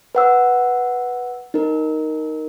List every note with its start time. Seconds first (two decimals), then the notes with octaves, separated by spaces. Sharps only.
0.15 B4 F#5 E6
1.54 D#4 A#4